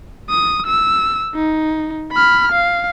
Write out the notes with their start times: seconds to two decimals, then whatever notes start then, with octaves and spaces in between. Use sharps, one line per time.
0.30 D#6
0.66 E6
1.34 D#4
2.12 B5 F6
2.52 F5